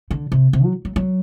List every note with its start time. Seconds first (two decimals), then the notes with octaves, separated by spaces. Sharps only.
0.11 D3
0.32 C3
0.53 C3
0.64 F#3
0.85 F#3
0.96 F#3